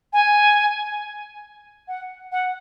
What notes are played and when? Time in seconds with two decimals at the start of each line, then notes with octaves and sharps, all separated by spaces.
0.13 G#5
1.88 F#5
2.32 F#5